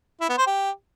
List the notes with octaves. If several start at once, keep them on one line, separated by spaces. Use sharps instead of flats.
E4
B3
C5
G4